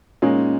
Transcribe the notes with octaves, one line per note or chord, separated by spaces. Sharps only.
A#2 G#3 A#3 C#4 D#4